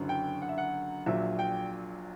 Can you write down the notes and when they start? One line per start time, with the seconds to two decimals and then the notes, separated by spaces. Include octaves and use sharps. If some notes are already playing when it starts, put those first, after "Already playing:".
Already playing: F#1 F#2 D3 F#3
0.09 G5
0.42 F#5
0.49 E5
0.58 F#5
1.06 A#1 A#2 F#3 E5
1.39 G5